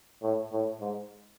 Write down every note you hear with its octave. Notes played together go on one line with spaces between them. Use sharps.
A2
A2
G#2